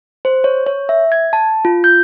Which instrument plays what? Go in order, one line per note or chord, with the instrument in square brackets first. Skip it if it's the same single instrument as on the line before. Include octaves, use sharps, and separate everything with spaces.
[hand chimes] C5
C#5
C#5
E5
G#6
A5
F4
G6